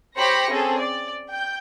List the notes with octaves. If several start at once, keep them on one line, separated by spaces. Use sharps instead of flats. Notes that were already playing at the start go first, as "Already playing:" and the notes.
G4 C5 C#5 B5 A#6 C#7
C4 C#4 G#4 A4
D5
G5 G6